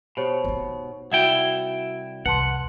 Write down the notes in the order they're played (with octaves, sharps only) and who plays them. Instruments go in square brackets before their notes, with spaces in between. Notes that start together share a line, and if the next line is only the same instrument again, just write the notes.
[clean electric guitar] B2 [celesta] G4 C5 C#5
[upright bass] A#3 D#4
[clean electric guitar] C2 E4 G5 [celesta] F#4 E5 F#5
[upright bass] C2 F2 [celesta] B4 A5 C6 [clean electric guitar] F#5